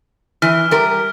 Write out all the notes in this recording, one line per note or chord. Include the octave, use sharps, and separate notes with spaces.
E3 F6
G3 A#4